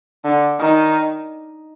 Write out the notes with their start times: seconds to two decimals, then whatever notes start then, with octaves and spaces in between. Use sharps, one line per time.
0.25 D3
0.60 D#3